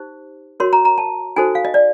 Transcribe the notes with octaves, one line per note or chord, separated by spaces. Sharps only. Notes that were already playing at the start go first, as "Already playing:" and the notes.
Already playing: D#4 G4 C5
F#4 A#4 C#5 C6
A#5
A#5
A5
D#4 F#4 A4 C5 G#5
F5
D#5
D5